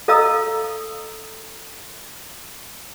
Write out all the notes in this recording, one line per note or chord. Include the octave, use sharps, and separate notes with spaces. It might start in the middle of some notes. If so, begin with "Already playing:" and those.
A4 D#5 F5 A#5 D#6 E6